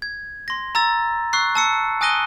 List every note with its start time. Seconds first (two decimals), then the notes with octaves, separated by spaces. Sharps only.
0.02 G#6
0.48 C6 A#6
0.75 A#5 E6 A6
1.33 C#6 E6 F#6 C7
1.55 A5 E6 C#7
2.01 G#5 D#6 F#6 A#6 D#7 G7